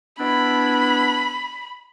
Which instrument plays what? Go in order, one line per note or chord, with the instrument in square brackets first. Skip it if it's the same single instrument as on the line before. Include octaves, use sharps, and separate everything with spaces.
[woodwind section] B3 D4 E4 [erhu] B5